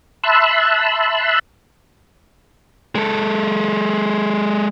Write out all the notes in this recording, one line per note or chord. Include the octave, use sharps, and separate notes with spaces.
E5 A5 B5 C6 E6 F#6
G#3 A4